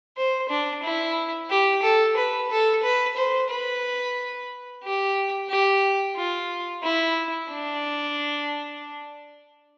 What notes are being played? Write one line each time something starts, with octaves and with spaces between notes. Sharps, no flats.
C5
D4
E4
G4
A4
B4
A4
B4
C5
B4
G4
G4
F4
E4
D4